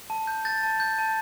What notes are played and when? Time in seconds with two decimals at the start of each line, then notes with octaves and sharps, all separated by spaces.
0.10 A5
0.27 G6
0.45 G6 A6
0.63 A5
0.80 G6
0.99 A5